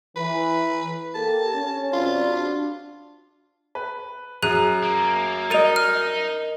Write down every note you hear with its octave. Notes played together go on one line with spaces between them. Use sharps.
E3 B4
A#3 G4 A4 A5
C#4
F#2 C3 F4 D5
D4 F#4
B4
F#2 G#4 F#6 D#7
A#3
D#4 A#4 D#5 A6 D#7 F7
F6